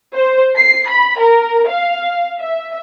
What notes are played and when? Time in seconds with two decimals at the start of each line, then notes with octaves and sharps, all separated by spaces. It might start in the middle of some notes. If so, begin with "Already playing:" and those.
0.14 C5
0.56 C7
0.90 B5
1.20 A#4
1.70 F5
2.39 E5